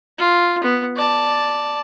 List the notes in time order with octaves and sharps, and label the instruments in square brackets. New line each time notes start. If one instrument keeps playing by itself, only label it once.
[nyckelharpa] F4
B3
D5 A5